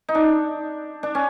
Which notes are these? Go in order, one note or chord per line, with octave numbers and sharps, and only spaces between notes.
D#4
D4
D4
C#4